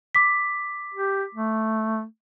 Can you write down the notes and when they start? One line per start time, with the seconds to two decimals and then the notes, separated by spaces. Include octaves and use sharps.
0.15 D6 B6
0.94 G4
1.35 A3